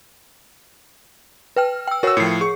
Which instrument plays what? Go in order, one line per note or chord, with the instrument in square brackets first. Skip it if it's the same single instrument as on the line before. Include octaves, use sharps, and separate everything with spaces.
[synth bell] B4 G5 F6
G5 E6
[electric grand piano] F#4 E6 [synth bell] A#4 C#5
[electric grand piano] A2 F3 [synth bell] C7 C#7
[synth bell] G#4 [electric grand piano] C#6